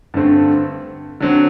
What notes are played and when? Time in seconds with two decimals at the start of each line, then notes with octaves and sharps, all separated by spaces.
0.14 G2 D3 A3 C4
1.21 D3 F#3 C4